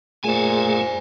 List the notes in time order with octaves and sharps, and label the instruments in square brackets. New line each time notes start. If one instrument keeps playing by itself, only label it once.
[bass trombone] A#2 [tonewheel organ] A3 G#4 [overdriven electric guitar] C5 G#5